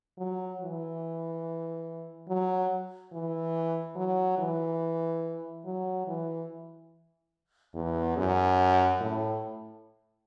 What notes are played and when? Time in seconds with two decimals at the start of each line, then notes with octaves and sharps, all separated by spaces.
0.18 F#3
0.61 E3
2.28 F#3
3.12 E3
3.96 F#3
4.38 E3
5.65 F#3
6.07 E3
7.74 E2
8.17 F#2
9.00 A2